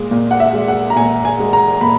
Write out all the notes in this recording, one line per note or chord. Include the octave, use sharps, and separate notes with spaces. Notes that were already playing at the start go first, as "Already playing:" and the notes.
Already playing: A#2 G#3
A#2
F#5
E5
G#3
F#5
A#5
A#2 G#5
G#5
G#3
A#5
A#2 B5